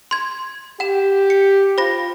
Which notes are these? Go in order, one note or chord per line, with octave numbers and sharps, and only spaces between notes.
C6 G#6
G4 F#5 E7
C#7
F4 C5 B5 A#6